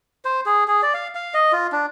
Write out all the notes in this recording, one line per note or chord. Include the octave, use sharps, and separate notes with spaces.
C5
G#4
G#4
D5
F5
F5
D#5
F4
D4